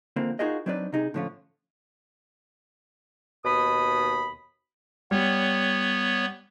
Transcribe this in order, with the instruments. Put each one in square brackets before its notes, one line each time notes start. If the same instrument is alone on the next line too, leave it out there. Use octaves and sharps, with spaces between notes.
[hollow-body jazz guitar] D3 E3 A#3 C4 F4 A#4
D#4 F4 F#4 G#4 A#4 D#5
F#3 C4 D4 D#4 B4 D5
C3 D#4 G#4
A2 D3 F3 C#4 F4
[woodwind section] D#2 B2 B5 D#6
[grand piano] G3 [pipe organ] B3 C#5